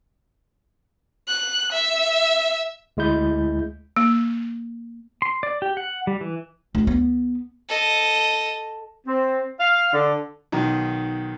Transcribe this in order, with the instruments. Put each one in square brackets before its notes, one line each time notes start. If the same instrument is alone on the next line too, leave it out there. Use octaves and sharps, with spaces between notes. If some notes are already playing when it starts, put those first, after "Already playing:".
[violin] F#6
E5
[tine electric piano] D2 G#3 E4 G6
[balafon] A#3
[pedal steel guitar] C6
D5
G4
F#5
G3
E3
[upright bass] D2
B3
[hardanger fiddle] A4 D#5
[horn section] C4
F5
D3
[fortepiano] B1 D#3